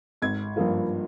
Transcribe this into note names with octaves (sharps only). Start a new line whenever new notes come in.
G#1 G#6
G2 F3 A#3 F4